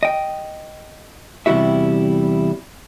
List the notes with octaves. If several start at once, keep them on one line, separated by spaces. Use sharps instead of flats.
D#5 G5
E2 C3 G3 E4 F#4 E5